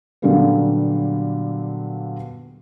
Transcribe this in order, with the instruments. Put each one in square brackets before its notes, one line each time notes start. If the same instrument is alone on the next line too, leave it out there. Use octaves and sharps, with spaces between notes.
[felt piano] A#2 D3 F#3 G3 A#3 B3